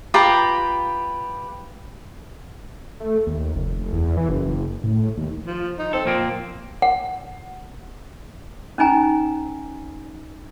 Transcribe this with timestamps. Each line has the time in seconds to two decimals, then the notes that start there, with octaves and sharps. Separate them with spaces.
0.14 F4 G4 B4 A#5
3.00 A3
3.27 D#2
3.55 F1
3.92 E2
4.17 E3
4.29 F#1
4.84 A2
5.17 D#2
5.46 F3
5.78 D#4
5.93 C4 A4
6.06 A#2 F3 A#3 C4
6.82 F#5
8.78 C#4 D#4 G#5 A#5